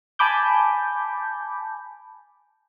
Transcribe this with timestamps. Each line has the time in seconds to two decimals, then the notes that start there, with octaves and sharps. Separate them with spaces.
0.19 G#5 A5 B5 D6 G6